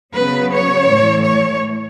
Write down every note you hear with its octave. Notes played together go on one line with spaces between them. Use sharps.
C#3 F#3 B3 B4
C#5
A2 E3 A3
C#5